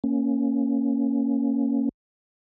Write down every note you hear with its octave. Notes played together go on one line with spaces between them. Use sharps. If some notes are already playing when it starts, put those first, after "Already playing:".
A#3 C#4